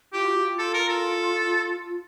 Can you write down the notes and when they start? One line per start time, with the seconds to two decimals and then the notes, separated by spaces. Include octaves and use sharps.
0.13 F4 G4
0.25 F#4
0.39 F4
0.59 A4
0.74 A#4
0.89 A4